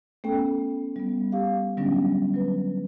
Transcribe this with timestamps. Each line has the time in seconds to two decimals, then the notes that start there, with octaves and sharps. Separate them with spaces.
0.24 A3 B3 C#4 A4 G5
0.96 G3 B3
1.32 G4 F5
1.77 D3 F#3 G3 B3 C#4 D4
2.34 F#3 B4